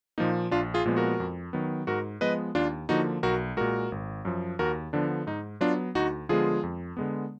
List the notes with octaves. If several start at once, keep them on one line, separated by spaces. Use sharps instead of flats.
A#2 F3 A#3 D#4
A#1 D4 F4
F4 G#4
A#2 F3 G#3 B3
F#4 A#4
F2
D#3 F#3 B3
G#2 F#4 A#4
F3 G#3 B3 B4 D#5
D#2 D4 F4
D3 F3 A#3 D#4 F#4
B1 F#4 A#4
A#2 G#3 F#4 A#4
G#1
F#2 F3
D#2 F#4 A#4
D3 F3 B3 D4
G#2 D#4
F#3 B3 D4 F4
D2 D#4 F#4
D3 F3 G#3 B3 F4 G#4
F2
D3 G#3 B3